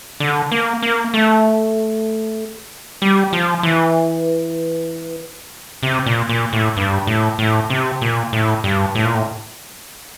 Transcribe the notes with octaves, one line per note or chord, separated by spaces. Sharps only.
D3
A#3
A#3
A3
G3
F3
E3
C3
A#2
A#2
A2
G2
A2
A2
C3
A#2
A2
G2
A2
A#2
A2